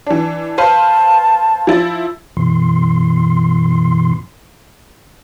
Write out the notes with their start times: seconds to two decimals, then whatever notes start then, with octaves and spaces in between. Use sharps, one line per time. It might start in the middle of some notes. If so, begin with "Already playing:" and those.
0.06 E3 D4
0.58 B4 C5 F5 A5
1.67 F3 E4 A6
2.37 F#2 B2 E3 C6